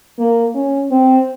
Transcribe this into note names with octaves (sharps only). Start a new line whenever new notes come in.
A#3
C#4
C4